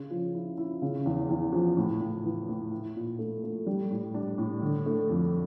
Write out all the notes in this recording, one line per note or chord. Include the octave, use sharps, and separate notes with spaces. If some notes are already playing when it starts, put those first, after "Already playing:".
Already playing: C#3
F3
E4
E4
C#3
E2
E2
F3
A2
A2
E3
A2
E4
A#2
A3
A3
G3
A2
D4
A2
D3
A3
F2